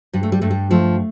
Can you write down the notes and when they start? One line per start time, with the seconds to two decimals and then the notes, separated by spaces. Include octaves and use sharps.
0.13 G2 G3
0.23 A3
0.32 G3
0.41 G2 A3
0.51 G3
0.71 F3 A3